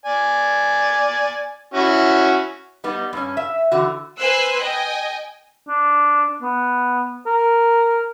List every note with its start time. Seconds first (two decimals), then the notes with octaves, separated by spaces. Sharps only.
0.06 D5 G#5
1.74 C#4 E4 F#4
2.84 G3 B3 D#4
3.13 G2 C#4
3.37 E5
3.72 D3 E3 F#4
4.17 B4 C5 G#5 C6 E6 F#6
4.59 D#5 G5 G#5
5.68 D4
6.42 B3
7.26 A#4